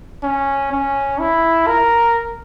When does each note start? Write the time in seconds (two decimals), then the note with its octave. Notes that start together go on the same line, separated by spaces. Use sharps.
0.23 C#4
0.72 C#4
1.20 E4
1.67 A#4